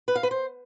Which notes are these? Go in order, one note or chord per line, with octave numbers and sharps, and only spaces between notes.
B4
F5
B4
C5